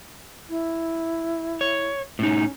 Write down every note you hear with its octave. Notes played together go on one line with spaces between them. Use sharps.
E4
C#5
A2 C#4 D#4